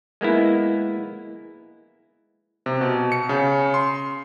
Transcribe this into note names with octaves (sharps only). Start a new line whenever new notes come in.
G#3 A#3 B3 E4
C3
B2
C#7
C#3
C6